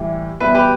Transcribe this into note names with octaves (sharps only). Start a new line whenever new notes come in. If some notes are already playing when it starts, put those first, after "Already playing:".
Already playing: A2 E3 G3
E2 B2 G3 B4 E5
G4 B4